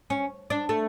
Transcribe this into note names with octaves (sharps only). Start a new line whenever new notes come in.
C#4
D4
A3